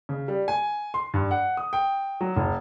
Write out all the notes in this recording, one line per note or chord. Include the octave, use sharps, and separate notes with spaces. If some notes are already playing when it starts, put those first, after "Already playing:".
C#3
G3
G#5
C6
G2
F#5
D#6
G5
F#3
F#1